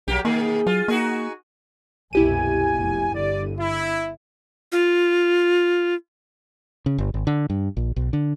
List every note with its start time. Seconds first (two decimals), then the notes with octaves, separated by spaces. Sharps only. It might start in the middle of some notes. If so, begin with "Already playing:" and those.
0.08 B1 F#3 A#3 G4
0.25 B2 D#3 A#3 G#4
0.67 F#3 F4
0.88 A#3 D#4 F#4 G#4
2.13 C2 F#2 B2 E4 G4 G#5 D#7
2.72 F1 B2
3.14 G1 D3 D5
3.59 E4
4.72 F4
6.86 C#3
6.98 G1
7.14 G#1
7.27 D3
7.50 G2
7.77 A#1
7.96 B1
8.13 D3